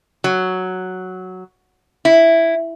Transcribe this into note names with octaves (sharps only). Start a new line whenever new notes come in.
F#3
E4